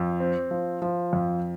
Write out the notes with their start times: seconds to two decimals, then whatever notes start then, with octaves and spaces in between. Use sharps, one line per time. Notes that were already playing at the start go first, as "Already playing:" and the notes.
Already playing: F2
0.20 C4
0.51 F3
0.82 F3
1.13 F2